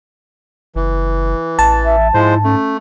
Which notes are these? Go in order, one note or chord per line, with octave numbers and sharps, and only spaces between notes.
F#1 E3
A1 A5
E5
G#2 F3 G#3 E4 C5
A3 C#4